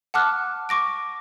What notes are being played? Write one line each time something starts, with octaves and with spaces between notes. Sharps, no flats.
F#5 A5 D6 F6 F#6
C#6 D6 A#6 D7